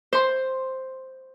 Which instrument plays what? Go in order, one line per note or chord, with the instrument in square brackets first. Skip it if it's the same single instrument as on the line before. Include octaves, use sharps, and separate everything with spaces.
[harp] C5 C6